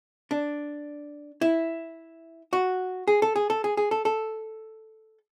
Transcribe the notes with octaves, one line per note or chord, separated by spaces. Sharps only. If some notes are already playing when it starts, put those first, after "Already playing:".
D4
E4
F#4
G#4
A4
G#4
A4
G#4
G#4
A4
A4